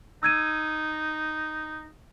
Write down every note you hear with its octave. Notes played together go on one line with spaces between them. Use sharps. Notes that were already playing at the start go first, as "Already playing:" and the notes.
D#4 E6 G#6 D#7